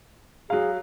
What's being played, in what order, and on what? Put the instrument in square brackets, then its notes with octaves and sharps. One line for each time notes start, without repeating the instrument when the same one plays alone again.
[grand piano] F#3 F5 [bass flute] G#4